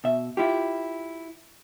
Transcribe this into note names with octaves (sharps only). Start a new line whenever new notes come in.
B2 E5
E4 F4 G4